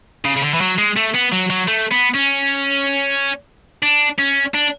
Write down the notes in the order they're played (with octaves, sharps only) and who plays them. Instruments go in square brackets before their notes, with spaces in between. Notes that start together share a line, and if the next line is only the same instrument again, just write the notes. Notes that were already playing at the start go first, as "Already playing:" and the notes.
[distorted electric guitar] C#3
C#3
D3
E3
F#3
G#3
A3
B3
F#3
F#3
A3
B3
C#4
D4
C#4
D4